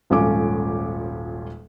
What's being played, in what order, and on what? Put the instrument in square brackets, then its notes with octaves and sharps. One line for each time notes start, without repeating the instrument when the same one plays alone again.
[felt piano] D#1 G#1 F3 C#4 A4 D6